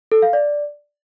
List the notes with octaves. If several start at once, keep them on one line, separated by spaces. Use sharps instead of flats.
A4
F5
D5